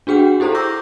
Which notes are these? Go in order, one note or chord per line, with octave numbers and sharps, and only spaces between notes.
D4 F#4 G#4 F#5 G5
E4 G4 A4 C5 A#5
C#6 D6 E6 G6 A#6